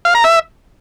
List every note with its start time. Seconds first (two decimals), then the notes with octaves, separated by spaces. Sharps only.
0.05 F5
0.15 A#5
0.24 E5